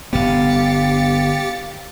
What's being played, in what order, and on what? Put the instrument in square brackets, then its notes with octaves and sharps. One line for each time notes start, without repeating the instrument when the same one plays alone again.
[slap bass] G1 F2 B3 [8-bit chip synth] G4 A6 C#7 [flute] F5